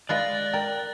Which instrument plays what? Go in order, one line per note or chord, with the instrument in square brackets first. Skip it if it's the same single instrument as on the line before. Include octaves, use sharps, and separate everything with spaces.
[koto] G#3 F4 B4 [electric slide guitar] D5 [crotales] F#6 A6 A#6
[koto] A#4 [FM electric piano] G5